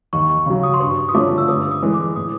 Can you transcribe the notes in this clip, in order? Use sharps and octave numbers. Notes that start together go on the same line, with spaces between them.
D#2 C#6
C#6
C#3 F#3
D#6
C6
G2 C#6
D#6
D3 F3 A3 C#4 D6
E6
G2 D#6
D#6
E3 G#3
D6
A2 D#6